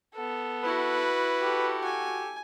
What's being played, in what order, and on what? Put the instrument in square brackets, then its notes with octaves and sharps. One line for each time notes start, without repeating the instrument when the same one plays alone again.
[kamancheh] B3 A4
[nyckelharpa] E4 F#4 [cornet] B4
[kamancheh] G4 A4
[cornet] F#4 [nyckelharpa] G#5